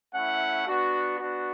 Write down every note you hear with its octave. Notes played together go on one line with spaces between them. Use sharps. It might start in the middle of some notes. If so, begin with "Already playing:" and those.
A3 C#4 E4 F#5
B3 D4 F#4
B3 D4 F#4